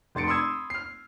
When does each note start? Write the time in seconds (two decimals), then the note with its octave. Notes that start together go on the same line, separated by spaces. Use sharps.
0.15 F1 C6 A6 C#7 D7
0.27 B5 C6 D#6 E6 G#6
0.70 F6 C7